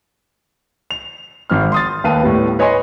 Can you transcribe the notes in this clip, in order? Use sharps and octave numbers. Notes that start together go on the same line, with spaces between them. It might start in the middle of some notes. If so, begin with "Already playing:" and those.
F7
G#1 C4 F6
C6 D#6 A6
D#2 B4 F5 A5 D#7
A2 G3 B3
B4 C#5 D#5 G#5 C6